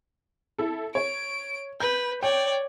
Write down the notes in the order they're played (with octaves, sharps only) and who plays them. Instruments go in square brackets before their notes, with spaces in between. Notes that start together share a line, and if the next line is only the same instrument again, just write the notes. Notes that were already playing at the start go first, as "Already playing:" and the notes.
[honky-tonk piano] E4 A4
[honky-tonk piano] C#5 [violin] D7
[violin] B4 [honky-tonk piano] G6
[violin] C#5 D5 [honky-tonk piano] G5